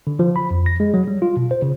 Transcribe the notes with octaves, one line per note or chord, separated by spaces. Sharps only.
D3
F3
B5
F2
A#6
G#3
F#3
G3
F4
B2
C5
C#3